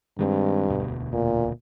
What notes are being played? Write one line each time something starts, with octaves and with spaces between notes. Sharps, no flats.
G2 D#3 G#3 C4
E1 D2 B2
A#2